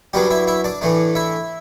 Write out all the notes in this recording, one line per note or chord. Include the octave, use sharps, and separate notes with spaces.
F#2 F#3 G3 B3 D4 G4
E4 E5
E4 E5
D4 D5
A2 E3 A3 D4
E4 E5